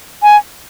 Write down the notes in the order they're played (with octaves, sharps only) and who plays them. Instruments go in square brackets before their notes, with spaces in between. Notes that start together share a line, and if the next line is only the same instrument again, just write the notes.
[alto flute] G#5